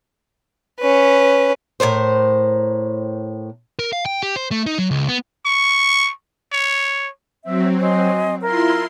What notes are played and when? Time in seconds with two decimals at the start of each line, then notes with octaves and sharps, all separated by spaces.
0.80 C#4 B4
1.80 A2 G3 A#4 C5
3.79 A#4
3.93 F5
4.06 G5
4.23 G4
4.36 C5
4.51 A3
4.66 D#4
4.79 F#3
4.91 C#2
5.08 B3
5.46 C#6
6.52 C#5
7.44 F#3 C4 E5
7.81 D#5 G#5 C6
8.41 E4 F4 A#4 C6